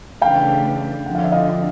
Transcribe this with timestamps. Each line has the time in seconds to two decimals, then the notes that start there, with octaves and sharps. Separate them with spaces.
0.21 C#3 E3 A3 D4 F5 G5
1.06 F2 D3 F3 F#5
1.15 F5
1.24 E5
1.32 D#5 F5